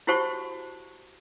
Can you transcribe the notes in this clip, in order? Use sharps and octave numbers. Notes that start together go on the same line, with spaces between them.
E4 F#4 G4 C5 A5 C#6